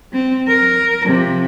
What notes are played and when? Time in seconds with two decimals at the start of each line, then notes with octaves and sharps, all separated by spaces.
0.13 C4
0.48 A#4
1.06 C3 F3